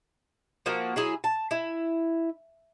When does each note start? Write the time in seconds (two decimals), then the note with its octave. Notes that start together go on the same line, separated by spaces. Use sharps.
0.66 F3 A#3 F#4
0.96 F#3 E4 G#4
1.24 A5
1.51 E4